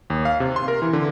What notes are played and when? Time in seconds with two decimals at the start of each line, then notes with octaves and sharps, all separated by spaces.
0.10 D#2
0.25 F5
0.40 C3
0.56 C6
0.68 A#4
0.82 E3
0.93 D3